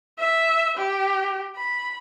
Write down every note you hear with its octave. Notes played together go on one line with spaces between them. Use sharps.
E5
G4
B5